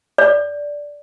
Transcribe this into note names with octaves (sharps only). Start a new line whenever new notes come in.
D5